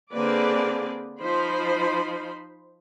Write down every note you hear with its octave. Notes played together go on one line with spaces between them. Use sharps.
D3 A#3 C4 G#4 B4 D5
F3 D#4 C5 B5 C6